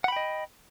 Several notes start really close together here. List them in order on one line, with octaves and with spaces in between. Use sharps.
F#5 B5 G5 D#5